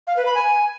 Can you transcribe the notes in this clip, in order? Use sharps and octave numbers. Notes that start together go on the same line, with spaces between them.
F5
B4
B5
G#5